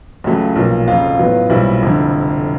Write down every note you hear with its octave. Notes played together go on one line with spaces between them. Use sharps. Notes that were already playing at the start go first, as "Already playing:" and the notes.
C#2 C#3 F#3 A3
B1 A#2 F3 A#3
F1 F2 C#3 F4
A1 A2 F#3 B3
B1 A#2 G3 C4 E4
F1 F2 D3